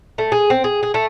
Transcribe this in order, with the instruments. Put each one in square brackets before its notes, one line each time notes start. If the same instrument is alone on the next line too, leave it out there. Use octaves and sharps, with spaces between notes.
[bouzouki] A3
G#4
C4
G#4
G#4
A3